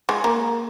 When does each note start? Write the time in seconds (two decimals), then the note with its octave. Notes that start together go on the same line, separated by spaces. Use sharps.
0.09 G#3
0.24 A#3